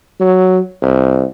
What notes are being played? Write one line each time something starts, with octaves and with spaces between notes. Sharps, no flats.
F#3
C2